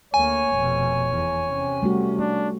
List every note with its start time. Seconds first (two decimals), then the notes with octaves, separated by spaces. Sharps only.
0.14 D2 A#3 C#5 G#5
0.52 F1 B2
1.11 E2
1.47 C3 C#4
1.82 G3 A3 F#4
2.19 A3 D4